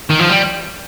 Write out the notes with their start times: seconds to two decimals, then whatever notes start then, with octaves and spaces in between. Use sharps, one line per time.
0.10 D#3
0.20 F3
0.30 G3